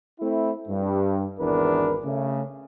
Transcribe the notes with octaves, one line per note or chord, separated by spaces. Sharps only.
A3 C4 E4
G2
G#1 E2 D4 A#4 B4
C#3 A3